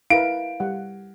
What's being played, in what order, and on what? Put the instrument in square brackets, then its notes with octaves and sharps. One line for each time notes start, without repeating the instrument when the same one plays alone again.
[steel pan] E4 A#4 B4 [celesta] F5 [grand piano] D7
[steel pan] G3 F#5